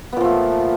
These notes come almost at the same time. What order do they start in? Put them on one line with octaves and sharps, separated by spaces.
B3 A#2 F3 A3